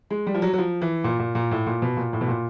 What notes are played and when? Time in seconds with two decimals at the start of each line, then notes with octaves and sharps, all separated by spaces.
0.10 G#3
0.27 G3
0.34 F3
0.42 F#3
0.53 F#3
0.58 F3
0.82 E3
1.04 A#2
1.19 A#2
1.35 A#2
1.51 A2
1.66 A#2
1.82 B2
1.97 A#2
2.13 A2
2.21 B2
2.28 A#2